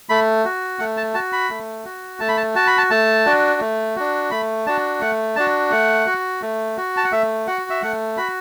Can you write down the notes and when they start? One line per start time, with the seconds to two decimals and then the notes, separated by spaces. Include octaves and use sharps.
0.09 A3 B5
0.45 F#4
0.79 A3 F#5
0.97 A5
1.14 F#4 A5
1.33 B5
1.50 A3
1.85 F#4
2.20 A3 A5
2.29 B5
2.37 A5
2.55 F#4 A5
2.67 B5
2.78 A5
2.90 A3 A5
3.26 D4 F#4
3.61 A3
3.96 D4 F#4
4.31 A3 B5
4.66 D4 F#4 A5
5.01 A3 F#5
5.36 D4 F#4 A5
5.71 A3 F#5
6.06 F#4
6.42 A3
6.77 F#4
6.97 A5
7.04 F#5
7.12 A3 E5
7.47 F#4 F#5
7.70 E5
7.82 A3 F#5
8.17 F#4 B5